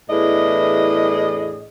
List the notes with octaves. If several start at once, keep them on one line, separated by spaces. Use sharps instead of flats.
E2 A2 E3 D4 G#4 D#5